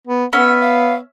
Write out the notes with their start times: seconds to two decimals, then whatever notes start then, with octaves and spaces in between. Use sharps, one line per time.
0.07 B3
0.33 B3 C#4 E5 F#5
0.61 F5